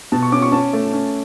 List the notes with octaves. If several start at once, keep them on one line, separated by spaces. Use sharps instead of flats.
B2 A5
C#6
C#4 D6
C#6
C#4 A5
A3
C#4